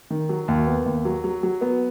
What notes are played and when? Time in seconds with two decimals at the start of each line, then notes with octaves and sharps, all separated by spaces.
0.10 D#3
0.29 F#3
0.48 D#2
0.67 B3
0.86 D#2
1.05 F#3
1.24 F#3
1.43 F#3
1.61 B3